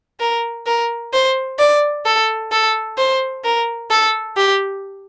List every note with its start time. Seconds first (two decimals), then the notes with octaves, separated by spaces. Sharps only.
0.20 A#4
0.66 A#4
1.13 C5
1.59 D5
2.06 A4
2.52 A4
2.98 C5
3.44 A#4
3.91 A4
4.37 G4